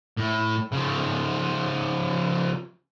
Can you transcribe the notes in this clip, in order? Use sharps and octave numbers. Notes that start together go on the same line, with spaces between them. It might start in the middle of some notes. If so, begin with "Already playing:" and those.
A2
C#3 F3